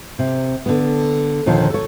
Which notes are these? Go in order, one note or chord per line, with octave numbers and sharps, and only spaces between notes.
C3
D3 B3
D#2 A#2 D3 D#3 F3
A4 C#5